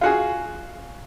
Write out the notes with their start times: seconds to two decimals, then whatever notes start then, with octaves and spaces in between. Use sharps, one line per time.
0.01 F4 F#4 G#4